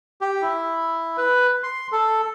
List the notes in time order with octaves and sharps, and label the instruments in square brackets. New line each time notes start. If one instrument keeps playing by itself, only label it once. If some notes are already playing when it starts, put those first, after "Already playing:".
[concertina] G4
E4
B4
C6
A4